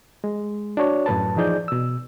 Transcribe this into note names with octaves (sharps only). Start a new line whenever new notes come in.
G#3
D4 F#4 C#5
F#2 A2 B4 A5
E3 F3 D#4 G#4 D5 G6
B2 E6